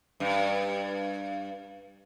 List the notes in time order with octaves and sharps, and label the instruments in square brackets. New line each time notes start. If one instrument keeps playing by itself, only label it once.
[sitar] G2